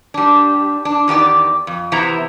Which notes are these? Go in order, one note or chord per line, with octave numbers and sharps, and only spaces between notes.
G3 D4
D4
E2 D#3 G4 D5
F2
C3 E3 B3 E4 C5 A#5